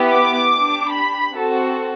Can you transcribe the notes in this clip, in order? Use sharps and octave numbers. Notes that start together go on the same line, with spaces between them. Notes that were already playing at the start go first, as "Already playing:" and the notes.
Already playing: B3 E4 G4
D6
D4 G4
B5
C4 F#4 A4